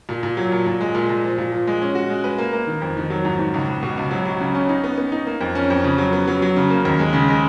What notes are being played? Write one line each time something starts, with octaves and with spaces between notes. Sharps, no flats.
A#2
A#2
F#3
A#2
A#2
G#3
A#2
A#2
F3
A#2
F3
G#3
C#4
F#4
G#3
B4
A#3
A#3
D#3
F2
D#3
F#3
G#2
G#2
C#2
C#2
B2
C#2
F#3
F#3
C#3
C#4
D#4
B3
B3
D#4
A#3
F2
C#4
F2
C#3
F#3
B3
F#3
F#3
C#3
A#3
D#2
G#3
C#3
G#3